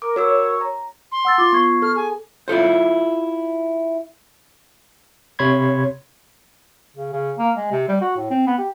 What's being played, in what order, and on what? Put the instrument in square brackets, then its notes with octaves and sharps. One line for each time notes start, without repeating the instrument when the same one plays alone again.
[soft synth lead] A#4 [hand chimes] D6
[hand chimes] F#4 A#4 E6 [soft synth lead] C#5
[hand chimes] A#5
[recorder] C6
[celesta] F#5 E6 A6
[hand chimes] F4 [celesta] D6 A6
[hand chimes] B3 G#6 C7 [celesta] C#6
[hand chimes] A4 [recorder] F6
[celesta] G#4 [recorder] G#5
[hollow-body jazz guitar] E4 F4 A4 C5
[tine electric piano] C3 C#5 B5 C6 G#6
[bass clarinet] C#3
C#3
A#3
G#3
C3
G3
F#4
A2
C4
B3
G4